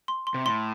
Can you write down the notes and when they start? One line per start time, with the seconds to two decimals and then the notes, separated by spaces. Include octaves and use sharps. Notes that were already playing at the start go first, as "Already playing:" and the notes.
0.08 C6
0.27 C6
0.34 C3
0.46 A2 C6